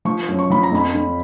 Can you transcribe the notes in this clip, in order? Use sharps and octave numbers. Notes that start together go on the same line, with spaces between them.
F3 C#6
F#2
C#6
F3 B5
A#5
F2 B5
F2